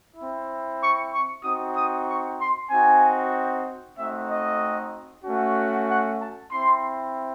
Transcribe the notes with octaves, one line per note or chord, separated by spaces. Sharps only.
C4 E4
C#6
C#6
C4 D#4 F#4 D#6
D#6
C#6
C6
C4 D#4 F#4 G#5
A3 C4 D#4 F#4 E5
D#5
A3 C#4 F#4
F#5
A5
C4 E4 C6